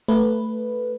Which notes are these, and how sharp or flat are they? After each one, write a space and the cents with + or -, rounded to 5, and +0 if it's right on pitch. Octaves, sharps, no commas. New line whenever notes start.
A3 +5 B4 +0